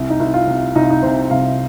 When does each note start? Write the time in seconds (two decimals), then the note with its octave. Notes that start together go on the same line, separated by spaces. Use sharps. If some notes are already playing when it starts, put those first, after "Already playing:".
Already playing: C2
0.10 D#4
0.20 C2
0.34 F4
0.47 C3
0.75 C2 D#4
0.82 F4
0.90 D#4
1.03 C3 C5
1.31 C2 F5